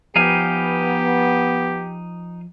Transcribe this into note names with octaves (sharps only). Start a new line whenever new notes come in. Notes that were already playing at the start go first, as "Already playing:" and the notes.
F3 B3 D#4 G4 F5 G#5